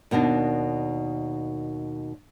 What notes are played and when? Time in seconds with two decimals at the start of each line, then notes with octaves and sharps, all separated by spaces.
0.11 D#2 B2 A#3 D4 D#4